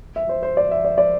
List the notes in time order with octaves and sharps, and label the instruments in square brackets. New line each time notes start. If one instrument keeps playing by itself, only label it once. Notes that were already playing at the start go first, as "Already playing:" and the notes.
[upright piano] E5
C5
C5
D5
E5
D5
D5